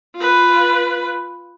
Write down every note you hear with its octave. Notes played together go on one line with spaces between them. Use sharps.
F4 B4